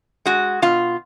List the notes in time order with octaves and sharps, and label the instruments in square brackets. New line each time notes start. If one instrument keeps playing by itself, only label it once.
[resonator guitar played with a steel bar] G#3 F#4
B2 F4